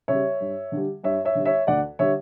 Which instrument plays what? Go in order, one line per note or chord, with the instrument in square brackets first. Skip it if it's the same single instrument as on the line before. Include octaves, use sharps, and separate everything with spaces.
[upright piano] C#3 G3 C#5 E5
G2
D3 G3
G2 C#5 E5
C#5 E5
D3 G3
C#5 E5
D2 D5 F#5
D3 G3 C#5 E5